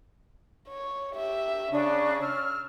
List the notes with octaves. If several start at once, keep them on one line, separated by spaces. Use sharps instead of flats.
C#5
G4 E5
C#3 C#4 D4 C#5
E6 F6